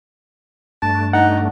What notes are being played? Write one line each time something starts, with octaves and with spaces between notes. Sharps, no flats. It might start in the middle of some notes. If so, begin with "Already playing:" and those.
G2 A3 D4 A5
D#4 F#5